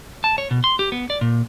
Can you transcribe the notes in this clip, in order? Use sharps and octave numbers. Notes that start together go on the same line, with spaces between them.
A5
C#5
B2
C6
G4
B3
D5
A#2